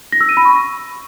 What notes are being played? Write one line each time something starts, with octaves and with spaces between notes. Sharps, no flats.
A#6
E6
D#7
B5
C#6